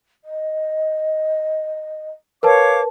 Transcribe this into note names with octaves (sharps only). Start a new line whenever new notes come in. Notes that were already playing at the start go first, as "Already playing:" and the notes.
D#5
A#4 B4 C#5 F5 A5 D6